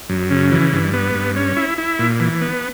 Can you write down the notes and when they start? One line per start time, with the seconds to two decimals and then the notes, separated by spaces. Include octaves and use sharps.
0.09 F#2
0.30 C#3
0.52 E3
0.73 G2
0.93 B3
1.15 G2
1.36 C#4
1.57 E4
1.78 E4
1.99 A#2
2.20 E3
2.41 B3